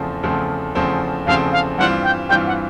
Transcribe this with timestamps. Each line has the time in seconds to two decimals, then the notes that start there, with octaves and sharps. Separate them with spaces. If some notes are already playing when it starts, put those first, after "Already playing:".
Already playing: E2 C#3 F3 A3 C4
0.23 E2 C#3 F3 A3 C4
0.75 E2 C#3 F3 A3 C4
1.26 E2 C#3 F3 A3 C4 F5
1.52 F5
1.77 G2 E3 G3 C4 F4 F#5
2.03 G5
2.29 G2 E3 G3 C4 F4 G5
2.47 F#5